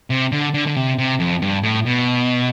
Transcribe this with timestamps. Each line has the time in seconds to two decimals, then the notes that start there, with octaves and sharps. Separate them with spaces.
0.10 C3
0.32 D3
0.54 D3
0.67 D3
0.76 C3
0.98 C3
1.20 F2
1.42 G2
1.63 A2
1.86 B2